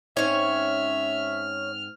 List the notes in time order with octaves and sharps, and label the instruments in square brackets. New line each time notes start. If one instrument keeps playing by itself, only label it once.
[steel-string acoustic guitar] G#2 C4 [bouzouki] C#4 C#5 [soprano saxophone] E5 [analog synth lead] F6